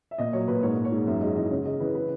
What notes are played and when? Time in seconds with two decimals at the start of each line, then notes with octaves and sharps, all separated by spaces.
0.11 E5
0.18 A#2 D#5
0.33 F#3 C#5
0.48 A#2 B4
0.63 G#2 C#5
0.78 G#2
0.85 C#5
0.92 G#2
1.07 F#2 E5
1.21 G#3 D#5
1.36 E3 D#5
1.51 C#3 C#5
1.65 C#3 D#5
1.80 E3 B4
1.95 C#3 B4